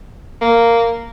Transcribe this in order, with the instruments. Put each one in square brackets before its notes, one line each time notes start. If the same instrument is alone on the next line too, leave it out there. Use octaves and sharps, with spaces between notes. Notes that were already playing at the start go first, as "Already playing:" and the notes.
[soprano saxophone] A#3